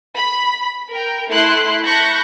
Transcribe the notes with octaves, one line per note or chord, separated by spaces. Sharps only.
B5
A#4 G5
A3 E4 C6 F#6
A5 B5 C#6 F#6 G6 A#6